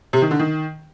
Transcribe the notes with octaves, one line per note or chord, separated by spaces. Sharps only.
C3
D#3
D3
D#3